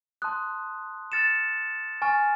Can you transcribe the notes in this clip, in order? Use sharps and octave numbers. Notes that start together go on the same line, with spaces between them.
A5 C6 D#6 F#6
F6 A6 C#7 E7
G#5 C#6 F6 A6